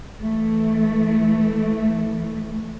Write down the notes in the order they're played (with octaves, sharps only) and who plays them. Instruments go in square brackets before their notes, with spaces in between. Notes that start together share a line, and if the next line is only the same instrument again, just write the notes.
[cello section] E3 A3